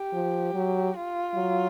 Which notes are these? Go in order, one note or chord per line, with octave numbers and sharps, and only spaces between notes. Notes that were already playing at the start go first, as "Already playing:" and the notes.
Already playing: G4
F3
F#3
F4
F#3